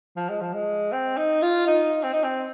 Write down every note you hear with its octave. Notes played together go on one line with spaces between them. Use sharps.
F3
G#3
F3
G#3
C4
D#4
F4
D#4
C4
D#4
C4